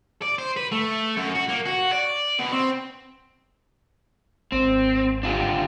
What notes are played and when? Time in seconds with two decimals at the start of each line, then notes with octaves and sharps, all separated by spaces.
0.22 D5
0.38 C5
0.57 B4
0.72 A3
1.17 F#2
1.36 F#4
1.50 A#3
1.66 F#4
1.93 D5
2.39 B2
2.52 C4
4.52 G#1 C4
5.23 D4 F4 G4